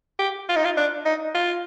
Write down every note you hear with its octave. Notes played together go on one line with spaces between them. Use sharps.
G4
F4
D#4
F4
D4
D#4
F4